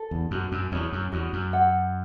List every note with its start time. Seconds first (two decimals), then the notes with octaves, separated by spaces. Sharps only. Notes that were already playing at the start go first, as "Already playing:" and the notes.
Already playing: A4
0.11 E2
0.31 F#2 F#4
0.52 F#2
0.72 E2 C#5
0.92 F#2
1.12 E2 F#4
1.33 F#2
1.53 F#5